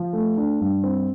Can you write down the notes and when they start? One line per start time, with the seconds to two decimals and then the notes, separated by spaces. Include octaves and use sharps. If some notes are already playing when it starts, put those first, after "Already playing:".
Already playing: F3
0.13 A3
0.37 D4
0.61 G2
0.84 C4